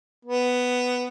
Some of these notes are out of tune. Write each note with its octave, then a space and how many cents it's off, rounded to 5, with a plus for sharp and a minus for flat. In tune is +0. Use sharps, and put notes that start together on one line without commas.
B3 +5